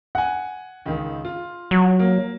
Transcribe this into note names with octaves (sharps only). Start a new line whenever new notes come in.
F#5 G#5
C#2 D#3
F4
F#3
A#3